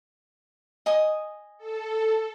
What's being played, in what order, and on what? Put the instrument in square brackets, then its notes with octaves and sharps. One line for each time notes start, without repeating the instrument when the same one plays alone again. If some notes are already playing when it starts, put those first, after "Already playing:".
[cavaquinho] D#5 G#5 D#6
[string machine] A4